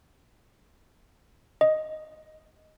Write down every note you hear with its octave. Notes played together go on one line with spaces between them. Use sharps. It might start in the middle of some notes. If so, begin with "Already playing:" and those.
D#5